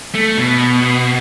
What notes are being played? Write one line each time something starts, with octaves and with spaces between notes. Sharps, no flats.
A3
B2